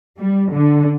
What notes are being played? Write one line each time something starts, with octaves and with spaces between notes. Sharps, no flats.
G3
D3